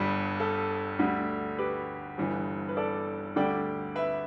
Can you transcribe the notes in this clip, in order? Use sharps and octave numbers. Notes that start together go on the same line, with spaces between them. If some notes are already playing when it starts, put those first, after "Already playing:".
Already playing: G1 G2 G3
A4
D2 D3 G3
G4 B4
G1 G2 E3
B4
A4 D5
D2 D3 G3 D5 G5
B4 E5